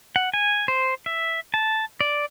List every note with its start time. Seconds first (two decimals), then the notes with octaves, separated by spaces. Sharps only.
0.16 F#5
0.34 G#5
0.68 C5
1.06 E5
1.54 A5
2.01 D5